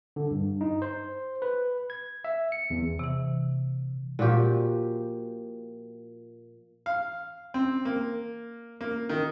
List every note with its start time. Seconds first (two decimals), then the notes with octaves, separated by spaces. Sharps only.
0.16 D3
0.31 G2
0.61 D#4
0.82 C5
1.42 B4
1.90 G#6
2.24 E5
2.52 C#7
2.70 E2
2.99 C3 E3
4.19 A#2 F3 F#4 G4
6.86 F5
7.54 C4
7.85 A#3
8.81 A#3
9.09 D#3